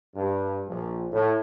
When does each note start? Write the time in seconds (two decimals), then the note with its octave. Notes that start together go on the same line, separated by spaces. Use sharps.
0.15 G2
0.66 A#1
1.11 A2